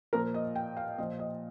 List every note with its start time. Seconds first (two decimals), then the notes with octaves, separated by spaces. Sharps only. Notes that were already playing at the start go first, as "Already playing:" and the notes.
0.13 A#2 F3 A#4
0.34 D#5
0.55 G5
0.77 F5
0.98 A#2 F3 D#5
1.19 D#5